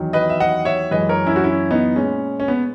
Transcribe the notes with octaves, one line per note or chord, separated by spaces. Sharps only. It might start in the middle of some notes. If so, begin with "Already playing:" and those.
Already playing: E2 D#3 F#3
B4 D#5
E5
D#5 F#5
C#5 E5
F#2 E3 G#3 B4 D#5
A#4 C#5
C#4 E4
F#4
C#4 E4
B3 D#4
A#2 G#3 C#4
C#4
B3